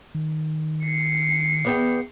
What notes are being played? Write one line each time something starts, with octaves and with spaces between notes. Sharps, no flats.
D#3
C7 C#7
E2 B3 G5